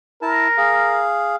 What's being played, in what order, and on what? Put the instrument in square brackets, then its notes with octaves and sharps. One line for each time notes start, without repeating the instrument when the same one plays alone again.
[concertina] E4 A5 [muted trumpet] A#4
[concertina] G#4 F5